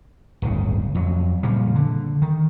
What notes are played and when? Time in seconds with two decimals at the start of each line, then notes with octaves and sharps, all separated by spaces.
0.42 D1 G1 C#3
0.95 F2 F#3
1.43 A#2 C#3 F3 G3
1.75 D3
2.22 D#3